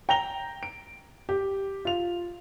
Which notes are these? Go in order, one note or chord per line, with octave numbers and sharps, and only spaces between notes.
G5 A#5 A#6 F7 G7
D7
G4
F4 F7